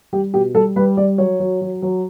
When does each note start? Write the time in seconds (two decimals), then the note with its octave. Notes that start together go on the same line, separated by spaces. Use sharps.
0.13 G3 G4
0.34 B2 G4
0.54 G3 A4
0.76 G3 B4
0.97 G3 D5
1.18 F#3 C#5
1.40 F#3
1.61 F#3
1.82 F#3